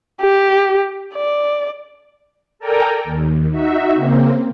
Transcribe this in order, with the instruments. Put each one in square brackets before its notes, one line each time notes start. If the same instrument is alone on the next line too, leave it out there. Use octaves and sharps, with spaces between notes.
[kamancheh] G4
D5
[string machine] A4 A#4 D5 G5 G#5 A#5
D#2
D#4 F#4 E5
C#3 A#3 C4